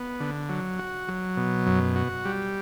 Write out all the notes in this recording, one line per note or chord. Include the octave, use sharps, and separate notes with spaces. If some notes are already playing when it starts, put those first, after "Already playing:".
Already playing: B3
D3
F#3
F#4
F#3
B2
F#2
F#4
G3